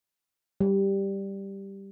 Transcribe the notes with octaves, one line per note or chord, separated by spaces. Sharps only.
G3